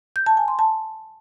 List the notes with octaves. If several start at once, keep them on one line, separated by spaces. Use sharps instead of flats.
G6
A5
G#5
C6
A5